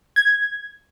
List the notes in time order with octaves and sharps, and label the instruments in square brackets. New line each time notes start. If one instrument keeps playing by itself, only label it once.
[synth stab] G#6